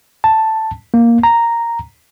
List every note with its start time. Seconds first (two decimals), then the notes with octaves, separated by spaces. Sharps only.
0.24 A5
0.94 A#3
1.23 A#5